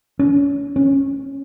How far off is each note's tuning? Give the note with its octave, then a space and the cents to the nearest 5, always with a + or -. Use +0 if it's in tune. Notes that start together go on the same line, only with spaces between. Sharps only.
C#4 +30
C#4 -15